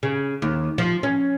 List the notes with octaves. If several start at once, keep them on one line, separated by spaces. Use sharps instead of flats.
C#3
D#2
F3
C#4